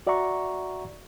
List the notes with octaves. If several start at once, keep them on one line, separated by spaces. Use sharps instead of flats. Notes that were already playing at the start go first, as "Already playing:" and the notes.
F#4 D5 E5 F#5 A#5 C#6